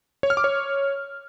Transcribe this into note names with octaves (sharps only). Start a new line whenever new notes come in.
C#5
F6
D6
C#5